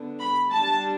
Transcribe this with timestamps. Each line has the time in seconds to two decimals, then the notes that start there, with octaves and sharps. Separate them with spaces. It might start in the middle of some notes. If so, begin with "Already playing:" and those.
Already playing: D3 B3 D4
0.19 B5
0.50 G3 D4 A5